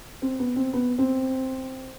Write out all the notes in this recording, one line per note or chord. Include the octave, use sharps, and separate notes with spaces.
C4
B3
C4
B3
C4